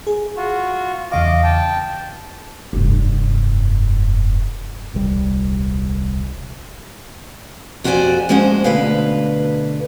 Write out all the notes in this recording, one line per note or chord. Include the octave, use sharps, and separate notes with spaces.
G#4
F4 F#4
E2 C#3 D#5 F5 D6
G5 A5
F1 G2
D#1 C2 G3
F2 F#4 G4 D5 G#5
F2 G#3 C#4 C5 F#5
D2 B2 B4 F5